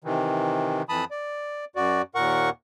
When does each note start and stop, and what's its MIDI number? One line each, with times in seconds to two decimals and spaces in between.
0.04 0.82 48
0.04 0.82 51
0.04 0.82 52
0.89 1.04 41
0.89 1.04 52
0.89 1.04 81
0.89 1.04 83
0.89 1.04 87
1.11 1.65 74
1.76 2.02 42
1.76 2.02 66
1.76 2.02 74
2.15 2.50 39
2.15 2.50 46
2.15 2.50 70
2.15 2.50 78
2.15 2.50 85